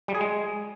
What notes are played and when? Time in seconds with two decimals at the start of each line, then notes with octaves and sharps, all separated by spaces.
0.08 G3
0.15 G#4
0.21 G#3